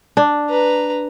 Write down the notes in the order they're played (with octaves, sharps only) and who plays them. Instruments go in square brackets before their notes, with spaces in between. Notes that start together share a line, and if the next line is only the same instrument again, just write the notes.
[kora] D4
[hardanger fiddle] B4 A#5